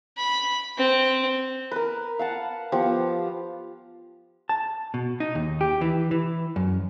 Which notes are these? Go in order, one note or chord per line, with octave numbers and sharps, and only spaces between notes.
B5
C4
A#4 B4
F5 F#5 A5
F3 B3 F4 G4
A5
B2
D#4
D#2
G4
E3
E3
F#2